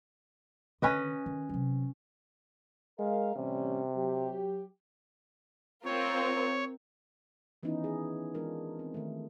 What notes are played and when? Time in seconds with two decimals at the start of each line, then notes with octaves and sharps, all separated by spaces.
0.82 D3 D#3 C#4 B4 D#5
1.26 D#3
1.49 C3 F#3
2.99 G#3 A#4 F5
3.36 A1 C3 G3 C#4
3.95 F#3 G4
5.85 C4 F4 A#4 C#5
7.63 D#3 E3 B3 C#4 D#4 E4
7.84 G#4
8.35 E3 G#3 D4 F4 A#4
8.79 C4
8.94 D#3 A3